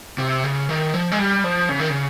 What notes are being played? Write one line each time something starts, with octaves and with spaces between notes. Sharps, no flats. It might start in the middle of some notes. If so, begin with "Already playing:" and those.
C3
C#3
D#3
F3
G#3
G3
F3
C#3
D#3
C#3